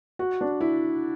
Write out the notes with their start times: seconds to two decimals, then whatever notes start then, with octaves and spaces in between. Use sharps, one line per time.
0.19 F#4
0.41 D4
0.61 E4